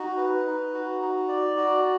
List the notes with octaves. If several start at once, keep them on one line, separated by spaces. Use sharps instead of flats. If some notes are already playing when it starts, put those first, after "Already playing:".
Already playing: D#4 F#4
B4
D#4
F#4
D#4
D5
F#4